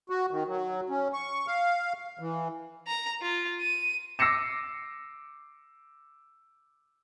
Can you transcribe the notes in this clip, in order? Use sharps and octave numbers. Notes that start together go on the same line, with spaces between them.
F#4
D#3
F#3
C#4
C#6
F5
E3
A#5
F4
D#7
D6 E6 A#6 C7 C#7 E7